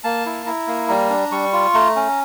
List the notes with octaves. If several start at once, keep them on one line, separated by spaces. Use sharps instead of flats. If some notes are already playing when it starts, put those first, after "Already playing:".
A#3 A5
E4
E4 A#5
A#3
G3 A#5
D4
G3 C#6
F4
A3 A#5
C#4